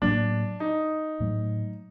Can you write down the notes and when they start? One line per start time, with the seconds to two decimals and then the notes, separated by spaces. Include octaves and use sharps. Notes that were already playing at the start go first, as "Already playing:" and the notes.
0.02 A2 F#3 A#3 D4
0.60 D#4
1.20 A2 F#3 A3